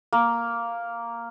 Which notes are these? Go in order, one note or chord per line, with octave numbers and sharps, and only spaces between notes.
A#3